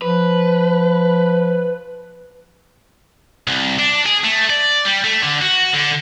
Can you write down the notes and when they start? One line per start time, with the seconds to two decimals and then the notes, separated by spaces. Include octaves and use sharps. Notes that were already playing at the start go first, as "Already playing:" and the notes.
0.02 F3 B4
3.47 C2
3.79 D4
4.06 G#4
4.24 A3
4.50 D5
4.86 G3
5.04 A3
5.23 D3
5.42 F#4
5.73 D3